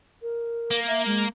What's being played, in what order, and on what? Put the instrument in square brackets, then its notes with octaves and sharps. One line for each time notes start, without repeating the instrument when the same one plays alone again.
[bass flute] A#4
[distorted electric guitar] A#3
[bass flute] E5
G#3